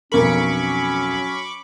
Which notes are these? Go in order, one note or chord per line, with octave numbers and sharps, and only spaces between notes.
B1 F2 F#3 C#4 A#4 B5 C#6 D6